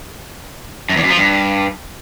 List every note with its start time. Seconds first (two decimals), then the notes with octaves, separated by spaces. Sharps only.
0.89 F#2
0.96 E2
1.03 F#2
1.10 F3
1.18 G2